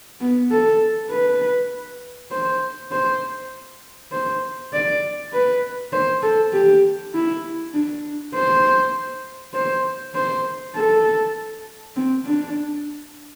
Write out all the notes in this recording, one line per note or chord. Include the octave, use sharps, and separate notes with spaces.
B3
A4
B4
C5
C5
C5
D5
B4
C5
A4
G4
E4
D4
C5
C5
C5
A4
C4
D4